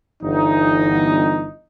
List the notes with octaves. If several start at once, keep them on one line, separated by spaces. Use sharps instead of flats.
G1 E3 D#4